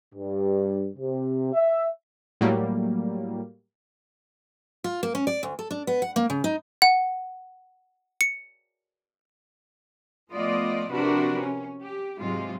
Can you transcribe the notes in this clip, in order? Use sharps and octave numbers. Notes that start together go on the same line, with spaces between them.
G2
C3
E5
A2 F#3 G3 A#3
F4
A#3
C#4
D5
D2
A4
D4
B3
F#5
A#3
C#3
D#4
F#5
C#7
F3 A3 B3 F4 D5 D#5
C3 F3 D4 F#4 A#4 B4
C#4
G4
G#2 C3 F#3 G#3 F4